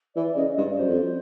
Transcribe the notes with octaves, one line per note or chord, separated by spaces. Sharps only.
E3 D5
C#3 D#5
G2 D5
F#2 C5
F2